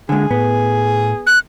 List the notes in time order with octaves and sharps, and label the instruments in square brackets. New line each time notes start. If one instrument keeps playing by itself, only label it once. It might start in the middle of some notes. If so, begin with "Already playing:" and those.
[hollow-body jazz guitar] D3 G#3 [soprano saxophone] G#4
[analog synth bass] A2 [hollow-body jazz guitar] B3
[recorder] F#6